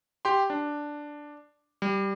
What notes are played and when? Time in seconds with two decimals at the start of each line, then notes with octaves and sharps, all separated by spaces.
0.25 G4 C6
0.50 D4
1.82 G3